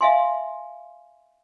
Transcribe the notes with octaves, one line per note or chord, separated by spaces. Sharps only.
E5 F5 G#5 C6